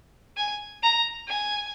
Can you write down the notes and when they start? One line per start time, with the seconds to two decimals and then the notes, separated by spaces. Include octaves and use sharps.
0.37 G#5
0.83 A#5
1.28 G#5